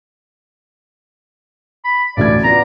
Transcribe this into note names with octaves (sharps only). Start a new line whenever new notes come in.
B5
A1 D2 D5 G#6
B3 F4 D5 A#5